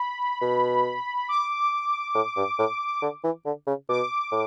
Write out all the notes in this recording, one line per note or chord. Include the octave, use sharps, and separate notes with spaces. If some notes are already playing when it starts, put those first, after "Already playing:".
Already playing: B5
B2
D6
A2
G2
A2
D3
E3
D3
C#3
B2 D6
A2